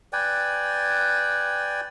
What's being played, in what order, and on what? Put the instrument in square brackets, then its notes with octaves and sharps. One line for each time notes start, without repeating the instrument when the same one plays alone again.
[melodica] B4 D5 G5 G#5